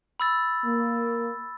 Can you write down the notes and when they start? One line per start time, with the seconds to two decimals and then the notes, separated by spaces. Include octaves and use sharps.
0.20 B5 E6 A6
0.64 A#3